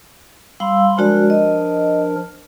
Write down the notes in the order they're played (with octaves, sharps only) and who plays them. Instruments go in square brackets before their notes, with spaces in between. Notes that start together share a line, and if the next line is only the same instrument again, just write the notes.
[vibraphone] G3 F5 E6 [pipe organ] B5 C6
[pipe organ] F3 D4 A#4 [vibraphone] G#3 F#4 D5
[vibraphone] D#5